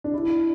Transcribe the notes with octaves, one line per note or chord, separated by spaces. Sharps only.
D4
E4